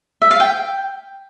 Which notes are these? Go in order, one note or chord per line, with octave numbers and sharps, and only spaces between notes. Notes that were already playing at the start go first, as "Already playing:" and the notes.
E5
F5
G5